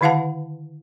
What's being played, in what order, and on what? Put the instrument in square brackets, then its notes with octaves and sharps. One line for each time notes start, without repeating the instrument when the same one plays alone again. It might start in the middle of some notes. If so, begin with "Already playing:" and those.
[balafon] D3 D#3 E4 F5 F#5 A5